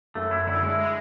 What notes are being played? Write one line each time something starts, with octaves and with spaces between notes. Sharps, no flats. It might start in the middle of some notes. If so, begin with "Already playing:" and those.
F#2 A3
F#2 E4
D3 E4
G#3 E4
G#3